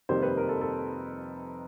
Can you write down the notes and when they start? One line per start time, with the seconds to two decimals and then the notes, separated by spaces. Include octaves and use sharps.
0.09 F2 C3 D#3 G3 A#3 C5
0.23 B4
0.37 A#4
0.49 A4
0.61 A4